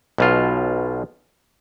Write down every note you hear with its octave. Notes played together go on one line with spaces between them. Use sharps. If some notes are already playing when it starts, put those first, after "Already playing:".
B1 B2 F4